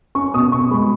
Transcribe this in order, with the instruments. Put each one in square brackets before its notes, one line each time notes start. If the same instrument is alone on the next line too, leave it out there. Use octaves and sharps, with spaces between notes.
[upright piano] C#4 C#6
B2 D#6
B2 C#6
G#3 B5